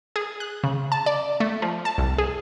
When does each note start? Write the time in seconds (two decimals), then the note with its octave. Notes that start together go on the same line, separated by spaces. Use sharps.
0.16 G#4
0.40 F#6
0.64 C#3
0.92 A5
1.06 D5
1.40 A3
1.62 F3
1.85 A5
1.98 C2
2.18 G#4